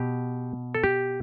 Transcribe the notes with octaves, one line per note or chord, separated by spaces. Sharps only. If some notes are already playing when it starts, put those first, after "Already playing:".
Already playing: B2 G4
A4
G4